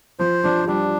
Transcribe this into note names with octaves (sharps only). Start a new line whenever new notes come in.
F3 C5
F3 D4
G3 D4